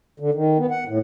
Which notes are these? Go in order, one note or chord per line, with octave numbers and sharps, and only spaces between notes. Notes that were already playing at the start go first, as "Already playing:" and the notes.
D3
D#3
B3
F#5
A2